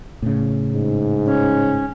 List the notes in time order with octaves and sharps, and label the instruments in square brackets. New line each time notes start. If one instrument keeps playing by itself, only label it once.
[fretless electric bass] A2 C#3
[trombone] G#2
[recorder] C#4